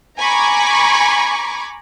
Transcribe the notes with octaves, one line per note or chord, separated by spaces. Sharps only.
G#5 A#5 B5 C#6 D6